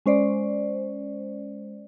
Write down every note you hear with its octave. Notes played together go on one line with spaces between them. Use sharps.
G#3 C#4 C5 D5